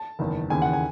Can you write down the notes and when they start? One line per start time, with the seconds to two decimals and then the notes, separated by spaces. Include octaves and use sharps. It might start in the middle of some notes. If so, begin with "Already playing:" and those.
Already playing: A5
0.19 F#1 E2 D#3
0.50 D#2 C#3 E3 G#5
0.62 F#5
0.73 G#5